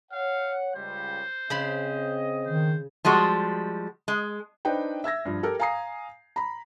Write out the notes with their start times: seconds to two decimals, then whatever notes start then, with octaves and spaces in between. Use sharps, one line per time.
0.12 C#5 F5 F#5
0.76 C#2 G3 C5
1.50 C#3 C4 D#5 B5 C6
2.46 D#3 C5
3.05 F3 G3 G#3 F#4
4.08 G#3
4.65 D4 D#4 B4 C5 G5
5.04 E5 E6 G#6 A#6
5.25 G2 F3
5.43 G4 A4 A#4
5.59 F5 G#5 A#5 D#6 C7
6.36 A#5 B5